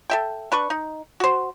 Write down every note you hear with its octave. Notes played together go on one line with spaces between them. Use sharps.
A4 E5 G5
D4 B4 C#6
D#4
F#4 C5